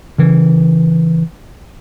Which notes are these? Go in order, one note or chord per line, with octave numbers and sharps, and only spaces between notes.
C#3 E3